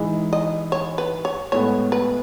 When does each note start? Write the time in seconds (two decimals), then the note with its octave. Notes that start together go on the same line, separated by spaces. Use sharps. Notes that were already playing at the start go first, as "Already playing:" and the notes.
Already playing: E3 G#3 D#4 G#4
0.33 D#5
0.72 C#5
0.98 B4
1.25 C#5
1.52 A2 G#3 B3 C#5
1.92 B4